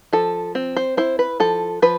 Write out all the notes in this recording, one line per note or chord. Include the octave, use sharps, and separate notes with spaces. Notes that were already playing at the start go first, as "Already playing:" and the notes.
F3 A4
C4
C5
E4 C5
B4
F3 A4
F3 B4